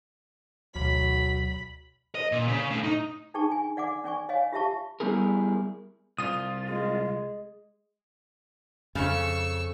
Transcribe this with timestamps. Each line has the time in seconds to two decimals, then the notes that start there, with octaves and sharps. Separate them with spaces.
0.76 A1 D2 B2 F#3 B5
2.15 D#5
2.32 A#2
2.48 C#3
2.70 A2
2.83 D#4
3.34 D4 D#4 G#4 G5 A5 C#6
3.52 G#5
3.77 D5 F#5 G#5 D6
4.04 C#4 D5 G#5 C#6
4.29 C#5 D#5 F5 G#5
4.52 F4 G4 E5 A5 C#6
5.00 G3 B3 E4 G#4 A#4
6.18 C2 F4 D#6
6.69 G#3
8.95 F2 C#3 C#6 E6